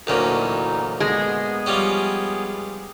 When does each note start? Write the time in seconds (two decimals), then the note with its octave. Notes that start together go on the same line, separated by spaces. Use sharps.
0.07 D2 A#2 E3 F#3 C#4 D#4
1.00 G#3 B3 G#4
1.66 F3 G3 C#4